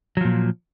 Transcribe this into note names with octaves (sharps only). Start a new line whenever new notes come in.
A#2 F3 F#3